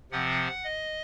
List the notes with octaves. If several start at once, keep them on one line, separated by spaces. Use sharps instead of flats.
C3 F3 C4 F#5
D#5